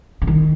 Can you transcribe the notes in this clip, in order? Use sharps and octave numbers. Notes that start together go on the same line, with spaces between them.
C#3
D#3